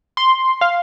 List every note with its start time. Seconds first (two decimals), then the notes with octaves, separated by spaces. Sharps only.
0.17 C6
0.61 F5